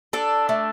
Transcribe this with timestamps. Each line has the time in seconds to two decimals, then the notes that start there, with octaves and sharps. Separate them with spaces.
0.13 D4 A4
0.49 A3